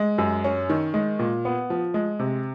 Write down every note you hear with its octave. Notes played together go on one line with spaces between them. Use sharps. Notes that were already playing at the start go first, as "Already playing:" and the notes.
Already playing: G#3
F#2
C#4
D#3
G#3
A#2
B3
F3
G#3
C3